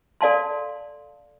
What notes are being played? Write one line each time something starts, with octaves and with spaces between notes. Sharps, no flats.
A4 D5 F5 A5 C6